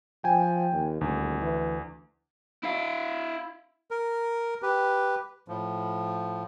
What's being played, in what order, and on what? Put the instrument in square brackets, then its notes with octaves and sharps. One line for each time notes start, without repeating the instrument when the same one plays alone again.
[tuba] F3 [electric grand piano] G5 G#5
[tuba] D#2
[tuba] D#1 [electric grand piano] D2
[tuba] E3
[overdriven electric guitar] E4 F5
[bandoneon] A#4
G4 B4
A2 F3